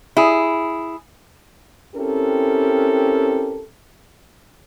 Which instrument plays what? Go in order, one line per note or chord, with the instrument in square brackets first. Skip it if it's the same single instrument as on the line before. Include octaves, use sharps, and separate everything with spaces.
[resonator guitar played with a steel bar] E4 G#4
[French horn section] C4 C#4 E4 G4 A4 A#4